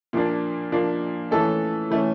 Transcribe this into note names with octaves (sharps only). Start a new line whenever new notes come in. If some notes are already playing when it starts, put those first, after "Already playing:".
A#2 F3 A#3 D4
A#2 F3 A#3 D4
E3 A3 C#4 A4
E3 A3 C#4